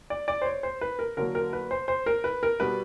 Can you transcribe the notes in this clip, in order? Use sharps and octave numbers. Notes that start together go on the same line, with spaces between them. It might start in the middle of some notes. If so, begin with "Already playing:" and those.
D5
D5
C5
C#5
C5
B4
A#4
D3 F#3 A#3 A#4
A#4
B4
C5
C5
A#4
B4
A#4
B2 G3 B3 B4